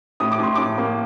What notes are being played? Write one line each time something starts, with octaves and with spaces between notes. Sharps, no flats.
A2 D#6
D6
A2 C6
A2 D6
A#3